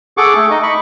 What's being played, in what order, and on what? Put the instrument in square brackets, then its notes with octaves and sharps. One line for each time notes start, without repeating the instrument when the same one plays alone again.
[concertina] G#4 A4 F#5 C#6 D6
A3 C#6
D#4 D#5
B5 C#6